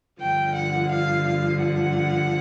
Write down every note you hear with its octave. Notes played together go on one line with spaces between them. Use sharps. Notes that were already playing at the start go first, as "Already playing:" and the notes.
G2 D3 F3 G5
F#5
F5
F5
F#5